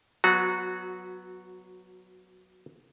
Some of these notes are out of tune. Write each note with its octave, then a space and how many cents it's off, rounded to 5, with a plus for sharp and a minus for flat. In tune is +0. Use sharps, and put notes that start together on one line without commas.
F#3 +0 B3 +0 F#4 -25